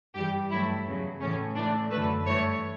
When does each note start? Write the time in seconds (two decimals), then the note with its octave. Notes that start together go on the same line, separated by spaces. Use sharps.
0.15 G2 E3 G3 G4
0.50 G2 F#3 A3 E4
0.86 E2 C#3 F#3
1.21 A2 E3 A3 C#4
1.56 A2 E3 A3 D4
1.91 F#2 D3 F#3 A3 B4
2.26 G2 E3 A3 C#5